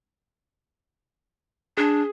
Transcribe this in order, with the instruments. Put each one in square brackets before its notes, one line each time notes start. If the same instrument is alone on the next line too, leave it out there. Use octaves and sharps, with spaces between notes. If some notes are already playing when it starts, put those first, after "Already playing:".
[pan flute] D4 [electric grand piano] G#4